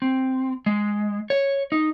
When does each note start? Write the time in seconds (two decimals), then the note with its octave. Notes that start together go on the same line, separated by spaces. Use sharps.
0.02 C4
0.66 G#3
1.30 C#5
1.72 D#4